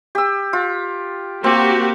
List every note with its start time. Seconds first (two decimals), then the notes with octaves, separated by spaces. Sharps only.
0.15 G4 E6
0.53 F4
1.44 A#3 C4 F#4 G4